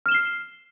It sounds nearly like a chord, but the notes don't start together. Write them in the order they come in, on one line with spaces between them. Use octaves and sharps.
F6 E7 G7 C7